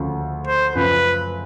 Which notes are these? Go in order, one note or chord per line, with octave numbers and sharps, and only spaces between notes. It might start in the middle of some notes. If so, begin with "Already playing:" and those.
Already playing: D2 C#3 F3 A3
C5
F#2 C#3 F3 B4